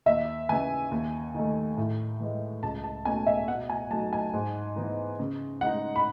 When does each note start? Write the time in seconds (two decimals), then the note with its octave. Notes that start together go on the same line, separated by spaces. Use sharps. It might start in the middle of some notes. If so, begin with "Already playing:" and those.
0.06 D#2 E5
0.49 C#3 E3 G#5
0.91 D#2
1.34 D#3 A3
1.77 A2
2.20 E3 G#3
2.63 C#2 A5
2.84 A5
3.05 B2 A3 C#4 G#5
3.26 E5
3.48 B2 F#5
3.70 G#5
3.90 F#3 A3 D#4 A5
4.13 G#5
4.33 G#2
4.76 E3 B3 D#4
5.19 C#3
5.61 G#3 D#4 F#5
5.96 B5